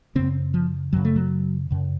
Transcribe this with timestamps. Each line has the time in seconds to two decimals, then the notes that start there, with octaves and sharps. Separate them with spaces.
0.15 F#2 C#3 C4
0.54 F3
0.93 F#2 C#3 F#3
1.05 A3
1.16 F#3
1.71 F#2 C#3